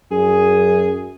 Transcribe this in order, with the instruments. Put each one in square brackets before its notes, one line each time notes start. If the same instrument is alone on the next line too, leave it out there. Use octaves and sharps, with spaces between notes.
[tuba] F#2 [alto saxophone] G#4